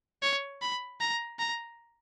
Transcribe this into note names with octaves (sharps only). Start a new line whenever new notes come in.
C#5
B5
A#5
A#5